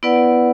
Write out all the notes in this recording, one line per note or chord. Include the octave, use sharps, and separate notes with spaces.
B3 E4 B4 D5 F#5